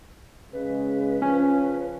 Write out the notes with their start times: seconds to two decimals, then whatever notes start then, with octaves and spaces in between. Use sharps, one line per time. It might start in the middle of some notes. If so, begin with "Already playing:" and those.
0.53 C#3 G#3 B4
1.22 C#3 F3 C#4